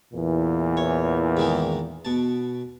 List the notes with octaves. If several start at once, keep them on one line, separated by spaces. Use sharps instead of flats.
E2 A#2 E3
C#5
G#2 D#3 G#3
B2 A5